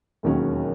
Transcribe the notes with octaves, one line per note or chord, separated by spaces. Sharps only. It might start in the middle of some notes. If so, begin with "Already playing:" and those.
E1 D#2 D#3 F#3 C#4